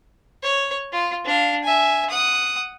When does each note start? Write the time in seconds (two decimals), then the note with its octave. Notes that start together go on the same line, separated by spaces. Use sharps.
0.43 C#5
0.92 F4
1.25 D4 F5
1.64 E5 G#5
2.10 F#5 D#6